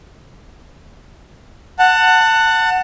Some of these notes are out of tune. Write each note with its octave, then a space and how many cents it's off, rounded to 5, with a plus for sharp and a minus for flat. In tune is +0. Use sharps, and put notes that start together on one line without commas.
F#5 +0 A5 +25